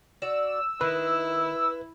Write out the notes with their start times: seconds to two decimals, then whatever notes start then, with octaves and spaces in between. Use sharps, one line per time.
0.22 F#4 D5 E6
0.81 D#3 E4 B4